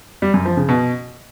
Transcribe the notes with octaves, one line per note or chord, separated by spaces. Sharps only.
G3
F#2
F3
C#3
B2